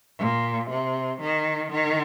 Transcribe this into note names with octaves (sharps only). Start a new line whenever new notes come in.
A#2
C3
D#3
D#3